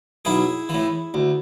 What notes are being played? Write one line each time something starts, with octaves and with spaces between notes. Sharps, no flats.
B1 E4 G#4
E3
A2
D2